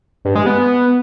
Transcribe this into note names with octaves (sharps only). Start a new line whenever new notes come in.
G2
G#3
B3